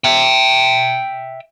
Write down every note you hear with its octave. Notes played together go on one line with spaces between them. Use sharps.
E5 G5